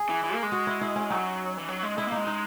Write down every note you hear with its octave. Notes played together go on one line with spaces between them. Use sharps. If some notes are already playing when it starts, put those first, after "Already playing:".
Already playing: G#4
E3
E3
A#3
G#3
F#4
E4
E4
C#4
F#3 D#4
E3
F#3
G#3
G#3 E4
A#3
G#3 D#4
D#4